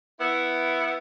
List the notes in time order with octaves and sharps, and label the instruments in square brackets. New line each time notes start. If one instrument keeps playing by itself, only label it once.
[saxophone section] B3 E4